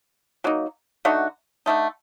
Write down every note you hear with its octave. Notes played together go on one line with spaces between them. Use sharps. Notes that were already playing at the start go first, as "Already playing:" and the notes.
F#3 A#3 D#4
D3 A3 D#4 F#4
D3 A3 D#4